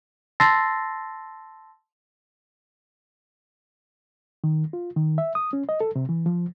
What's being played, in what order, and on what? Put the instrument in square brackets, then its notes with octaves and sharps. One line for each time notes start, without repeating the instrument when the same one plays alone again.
[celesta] A5 C6 E6 A6 A#6 C7
[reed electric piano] D#3
F4
D#3
E5
D#6
C#4
D#5
A4
C3
E3
F3